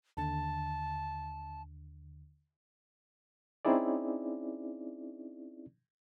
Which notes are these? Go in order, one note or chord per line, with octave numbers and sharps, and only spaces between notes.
D#2 D3 A5
C4 C#4 D#4 E4 G#4 D5